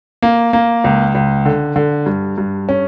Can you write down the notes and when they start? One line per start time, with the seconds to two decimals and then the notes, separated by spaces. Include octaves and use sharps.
0.22 A#3
0.53 A#3
0.84 C#2
1.15 C#2
1.45 D3
1.76 D3
2.06 G2
2.38 G2
2.69 C#4